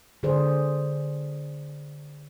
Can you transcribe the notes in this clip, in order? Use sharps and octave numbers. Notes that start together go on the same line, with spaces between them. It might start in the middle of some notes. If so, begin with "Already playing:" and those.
D3 G#4 C5 D5